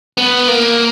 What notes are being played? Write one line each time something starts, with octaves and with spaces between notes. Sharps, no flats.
B3
A#3